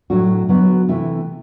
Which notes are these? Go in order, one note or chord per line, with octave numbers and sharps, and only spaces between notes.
A2 F#3 A3 D4 F#4
D3 F#3 B3 F#4
C3 E3 A3 E4